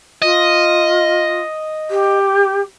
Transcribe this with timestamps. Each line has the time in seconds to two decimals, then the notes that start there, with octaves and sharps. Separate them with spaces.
0.22 F4 D#5
1.90 G4